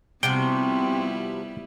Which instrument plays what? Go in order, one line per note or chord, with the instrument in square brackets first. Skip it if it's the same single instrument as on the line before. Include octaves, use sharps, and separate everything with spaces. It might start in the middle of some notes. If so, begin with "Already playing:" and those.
[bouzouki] C3 F3 F#4 [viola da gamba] G3 B3 E4 [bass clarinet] C4 [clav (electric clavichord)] G5